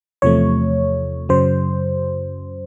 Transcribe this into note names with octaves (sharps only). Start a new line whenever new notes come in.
E2 C3 F3 A3 C#5
F#2 C#3 F#3 C5